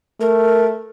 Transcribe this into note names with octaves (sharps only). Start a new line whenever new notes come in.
A3 A#4